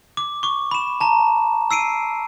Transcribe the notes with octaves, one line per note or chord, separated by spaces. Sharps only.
D6
C#6 D6
B5 E7
A5 A#5
E6 C7 D7 D#7